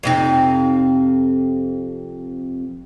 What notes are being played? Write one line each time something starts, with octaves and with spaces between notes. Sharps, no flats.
F2 C3 D#4